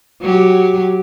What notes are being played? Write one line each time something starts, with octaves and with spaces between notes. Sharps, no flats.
F#3 G4